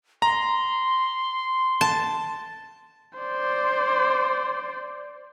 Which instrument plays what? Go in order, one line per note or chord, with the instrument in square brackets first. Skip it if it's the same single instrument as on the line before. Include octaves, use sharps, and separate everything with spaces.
[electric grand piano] A#5 [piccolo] C6
[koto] A5
[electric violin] C5 D5